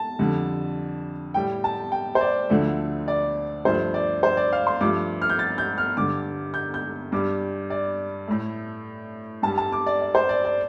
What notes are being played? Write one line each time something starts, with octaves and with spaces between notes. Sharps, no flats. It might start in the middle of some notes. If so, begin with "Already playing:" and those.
Already playing: A5
F2 D3 G3
A2 G3 G5
A5
G5
C5
D5
D2 D3 F3 A3
D5
G2 F3 A3 C5
D5
C5
D5
F5
C6
G2 F3 A3 D6
F6
G6
A6
G6
F6
G2 D3 G3 D6
G6
G6
G2 G3 D6
D5
A2 A3
G2 G3 A5
A5
D6
D5
D5
C5
D5
D5